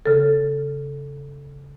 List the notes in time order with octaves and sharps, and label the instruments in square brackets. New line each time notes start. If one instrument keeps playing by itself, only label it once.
[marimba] C#3 A4